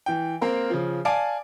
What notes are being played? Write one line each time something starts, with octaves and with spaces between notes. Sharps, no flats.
E3 G5
A#3 C4 A#4
C#3 F3
D5 F5 G#5 A5 D6 D7